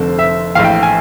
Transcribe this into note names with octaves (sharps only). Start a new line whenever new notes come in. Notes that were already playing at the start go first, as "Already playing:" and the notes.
Already playing: F1 F2 D3 C5
E5
A#1 A2 E3 F5
G5
G#5